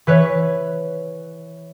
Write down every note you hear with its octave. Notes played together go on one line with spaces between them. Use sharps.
E3 B4 C#5